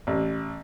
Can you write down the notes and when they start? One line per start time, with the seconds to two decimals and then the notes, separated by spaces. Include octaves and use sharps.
0.07 A1